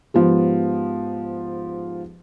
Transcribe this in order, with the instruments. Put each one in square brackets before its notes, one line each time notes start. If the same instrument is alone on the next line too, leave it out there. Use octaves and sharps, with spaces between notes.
[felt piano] G#2 F3 B3 G4